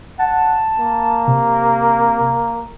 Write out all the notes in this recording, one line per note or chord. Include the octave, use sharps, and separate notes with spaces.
F#5 A5
A#3
C3